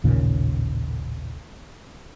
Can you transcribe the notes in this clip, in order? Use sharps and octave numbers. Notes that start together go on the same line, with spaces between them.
A1 D#2 A#2 C#3